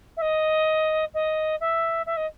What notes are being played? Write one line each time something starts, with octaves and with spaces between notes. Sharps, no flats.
E5
D#5
D#5
E5
E5
D#5